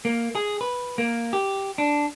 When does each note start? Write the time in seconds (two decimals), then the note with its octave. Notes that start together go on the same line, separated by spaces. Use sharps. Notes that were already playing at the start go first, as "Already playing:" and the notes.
0.05 A#3
0.35 G#4
0.61 B4
0.98 A#3
1.33 G4
1.78 D4